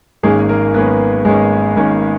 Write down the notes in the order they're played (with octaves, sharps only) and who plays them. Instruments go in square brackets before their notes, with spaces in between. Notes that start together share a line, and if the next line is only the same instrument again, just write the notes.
[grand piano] G#1 G#2 D#3 G#3 A#3 C#4 G#4
A#3 A#4
G#1 G#2 D#3 A#3 B3 C#4 B4
G#1 G#2 D#3 G#3 A#3 C#4 G#4
G#1 G#2 D#3 A#3 C#4